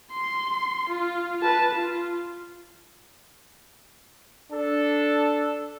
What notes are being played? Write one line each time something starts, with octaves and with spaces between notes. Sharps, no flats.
C6
F4
B4 A5
F4
D4 A4